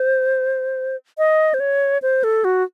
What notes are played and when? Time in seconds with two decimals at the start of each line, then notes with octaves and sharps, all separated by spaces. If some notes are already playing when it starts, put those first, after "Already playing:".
Already playing: C5
1.18 D#5
1.54 C5
1.60 C#5
2.02 C5
2.24 A4
2.44 F#4